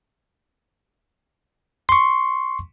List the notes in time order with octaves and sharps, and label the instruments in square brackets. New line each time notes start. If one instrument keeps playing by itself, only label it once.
[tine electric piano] C6 C#6